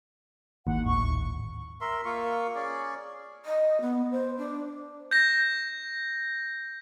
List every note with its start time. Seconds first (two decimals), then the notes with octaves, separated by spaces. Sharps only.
0.67 G#1 D#2 F#5
0.84 D1 G#1 C#6
1.81 A#4 E5 C6
2.05 A#3 F4 C#6
2.55 C#4 G#4 D5
3.45 D#5
3.81 B3
4.11 C5
4.38 D4
5.11 G6 A#6